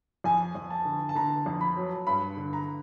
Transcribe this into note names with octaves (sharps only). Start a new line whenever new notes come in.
F2 G#5
F2
A5
D3
A5
D3 A#5
F2
B5
F#3
G2 B5
D3
A#5